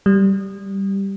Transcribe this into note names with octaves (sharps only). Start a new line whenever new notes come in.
G3